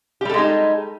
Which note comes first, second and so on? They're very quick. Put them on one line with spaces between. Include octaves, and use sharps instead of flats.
G4 G3 A4 G#3 D#4